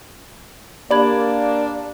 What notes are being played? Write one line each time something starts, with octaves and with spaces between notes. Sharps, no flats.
A#3 D4 G4 D5 B5 G#6